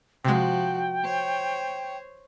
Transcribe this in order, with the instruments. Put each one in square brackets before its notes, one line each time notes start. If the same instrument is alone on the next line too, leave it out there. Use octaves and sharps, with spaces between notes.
[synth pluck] C3 G#3 [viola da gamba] F3 F#4 [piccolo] G5
[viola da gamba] C5 C#5